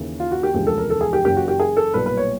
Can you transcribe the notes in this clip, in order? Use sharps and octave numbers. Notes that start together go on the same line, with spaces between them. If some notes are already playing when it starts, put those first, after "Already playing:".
Already playing: D#2 C#3 E3
F4
F#4
G4
E1 D2 C#3 F3 G#3 G4
A4
A#4
A4
G#4
G4
F#1 F#2 C#3 E3 G4
F#4
G4
G#4
A4
B1 A#2 G3 B4
B4
C#5